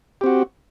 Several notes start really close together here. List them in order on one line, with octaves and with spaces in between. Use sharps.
G4 C4 F#4